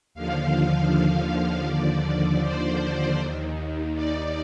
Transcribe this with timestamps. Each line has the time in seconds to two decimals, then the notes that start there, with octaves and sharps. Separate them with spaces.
0.15 D#2 D3 F3 F5
1.66 D#2 D3 F3 D5
2.42 C5
3.19 D#2 D#3
3.95 D5